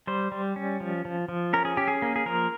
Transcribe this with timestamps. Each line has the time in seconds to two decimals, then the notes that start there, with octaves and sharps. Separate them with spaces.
0.07 G3 C5
0.32 G3
0.56 C#4
0.80 F3
1.05 F3
1.29 F3
1.53 C#4 A#4
1.65 G#4
1.77 C#4 G4
1.88 G#4
2.02 A#3
2.16 G#4
2.26 F3 A#4